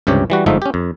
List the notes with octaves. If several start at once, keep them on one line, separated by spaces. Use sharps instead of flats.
C#2 G2 C3 G4 C#5
E3 G3 F#4
G1 G#2 F3 A3 D#4 E5
C#4 G4
F2